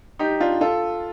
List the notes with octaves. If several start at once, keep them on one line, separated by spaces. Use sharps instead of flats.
D#4 G4
D4 F4
F4 A4